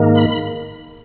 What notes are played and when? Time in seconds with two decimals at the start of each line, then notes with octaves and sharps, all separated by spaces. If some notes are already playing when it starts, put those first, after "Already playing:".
Already playing: G#2 D#3 A#3
0.15 B5